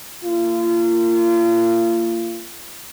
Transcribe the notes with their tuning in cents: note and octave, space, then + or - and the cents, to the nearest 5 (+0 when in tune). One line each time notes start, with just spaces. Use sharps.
A#3 -35 F4 -35